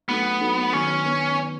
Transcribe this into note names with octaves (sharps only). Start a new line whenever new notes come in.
F#3 A3 B3 D#4 A4
F#3 A3 D#4 A4
D#3 F#3 B3 C#4
F#3 B3